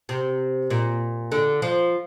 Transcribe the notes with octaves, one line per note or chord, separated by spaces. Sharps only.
C3
A#2
D3
F3